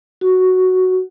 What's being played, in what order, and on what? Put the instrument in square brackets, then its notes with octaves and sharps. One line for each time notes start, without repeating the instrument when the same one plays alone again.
[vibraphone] F#4